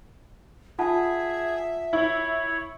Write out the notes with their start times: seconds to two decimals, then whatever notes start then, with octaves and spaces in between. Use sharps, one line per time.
0.79 F4 G#4 E5 F#5 A5
1.93 E4 C#5